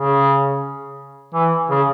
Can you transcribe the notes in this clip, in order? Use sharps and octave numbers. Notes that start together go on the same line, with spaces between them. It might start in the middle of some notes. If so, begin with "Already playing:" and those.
Already playing: C#3
E3
C#3